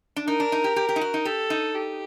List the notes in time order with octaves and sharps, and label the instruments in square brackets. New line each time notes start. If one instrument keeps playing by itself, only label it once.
[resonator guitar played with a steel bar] D4
[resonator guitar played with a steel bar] D#4 [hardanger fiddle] A#4
[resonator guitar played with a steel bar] D4
D#4
G4
G4
G4
D#4
F#4
D#4
[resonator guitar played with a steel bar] G4 [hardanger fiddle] A4
[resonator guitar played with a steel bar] D#4
[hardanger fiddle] G4